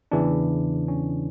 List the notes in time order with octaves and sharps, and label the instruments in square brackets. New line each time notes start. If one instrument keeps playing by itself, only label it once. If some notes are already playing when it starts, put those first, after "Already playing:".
[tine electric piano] E2 C#3 E3 D4
C#4